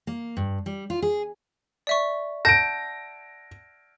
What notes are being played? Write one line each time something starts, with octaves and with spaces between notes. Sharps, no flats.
A#3
G2
G3
F4
G#4
D5 E5 C#6
F#5 A5 G6 A#6 D7